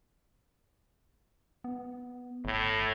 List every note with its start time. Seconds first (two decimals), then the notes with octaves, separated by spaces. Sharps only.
1.64 B3
2.45 G1 A2